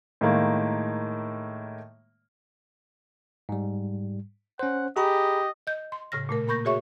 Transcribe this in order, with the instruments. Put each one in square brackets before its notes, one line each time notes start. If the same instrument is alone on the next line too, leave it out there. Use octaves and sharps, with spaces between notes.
[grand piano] A2 D#3 G#3 A#3
[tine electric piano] G#2 G3
[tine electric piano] C#4 C5 [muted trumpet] F#5
[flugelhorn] G4 [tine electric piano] G#4 A#5 B5 [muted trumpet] D#5
[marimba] D#5 G6
C6
A2 C#3 F6 A#6
A#2 A3 A#4
A#3 A#4 B5 C#6 G6 A#6
F#4 G#4 C#5 E5 C#6